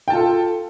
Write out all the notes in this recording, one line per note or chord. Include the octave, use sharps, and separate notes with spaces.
F4 A4 G5 A5